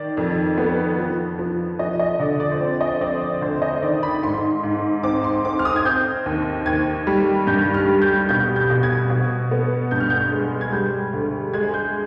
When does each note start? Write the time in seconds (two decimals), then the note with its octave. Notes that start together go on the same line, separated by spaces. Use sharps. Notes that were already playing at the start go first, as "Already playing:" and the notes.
Already playing: D#3 D5
0.17 F2
0.58 B3
0.98 F3
1.39 F3
1.79 F3 D#5
1.99 D#5
2.19 D3 D5
2.40 D5
2.52 C5
2.60 C4 D5
2.81 D#5
3.01 C4 D5
3.21 D5
3.41 D2 C5
3.62 D#5
3.82 D#3 D5
4.03 B5
4.23 G#2 C6
4.63 G#2
5.03 C4 D6
5.24 C6
5.45 C4 D6
5.59 F6
5.65 D#6
5.76 G#6
5.85 C4 G6
6.26 D#2
6.66 D#2 G#6
7.07 G3
7.47 G2 G6
7.74 F6
7.88 G3
8.02 G6
8.29 B2 G6
8.56 G6
8.70 B2
8.83 G#6
9.10 B2
9.51 B3
9.91 G2 G6
10.00 F6
10.10 G6
10.32 G#3
10.61 G#6
10.73 G3 G6
11.13 D2
11.53 G#3 G#6
11.74 G6